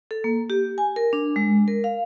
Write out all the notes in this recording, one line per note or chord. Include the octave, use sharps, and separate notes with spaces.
A4
A#3
G4
G#5
A#4
D4
G#3
A#4
F5